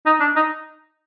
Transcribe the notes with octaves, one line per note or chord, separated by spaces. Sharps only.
D#4
D4
D#4